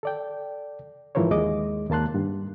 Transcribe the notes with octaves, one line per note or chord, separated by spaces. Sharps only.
A4 D5 G5
G#2 E3 F3 A#4 C5 C#5
D#2 G#3 D#5 D6
D#2 A#3 A5 C6 F#6
G2